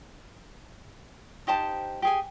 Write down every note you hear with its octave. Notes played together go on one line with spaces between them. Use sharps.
D#4 G4 C5 A5
G4 G#4 G#5